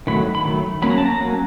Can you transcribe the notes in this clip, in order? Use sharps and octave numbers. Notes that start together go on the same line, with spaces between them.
D#3 F#3 A3 B5
B5
D#3 F#3 A3
F#3 A#3 C#4 B5
A#5
A5
A#5
F#3 A#3 C#4